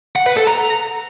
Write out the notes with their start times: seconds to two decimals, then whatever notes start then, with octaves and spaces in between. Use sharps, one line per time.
0.16 F#5
0.26 B4
0.37 A4
0.47 A#5